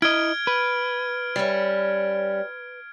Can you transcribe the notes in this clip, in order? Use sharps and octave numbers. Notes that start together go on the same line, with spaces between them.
E4 D#5 F6 G#6 D7
B4
G3 C#4